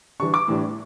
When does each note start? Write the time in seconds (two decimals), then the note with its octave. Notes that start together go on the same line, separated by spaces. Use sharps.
0.20 E3 G3 D4 C#6
0.34 D6
0.48 A2 E3 G3 D4